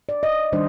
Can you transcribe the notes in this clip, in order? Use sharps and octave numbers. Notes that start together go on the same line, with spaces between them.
D5
D#5
D#3 G3 D4 C5